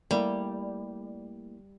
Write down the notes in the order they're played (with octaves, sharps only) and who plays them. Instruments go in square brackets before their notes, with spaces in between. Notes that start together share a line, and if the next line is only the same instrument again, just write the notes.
[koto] G3 [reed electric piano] A3 A#3 E4